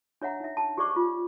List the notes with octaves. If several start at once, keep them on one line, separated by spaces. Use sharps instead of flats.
D4 C#5 E5 F#5 A#5
D#4 E5
A5
G4 G#4 C5 D5 C#6 D6
F4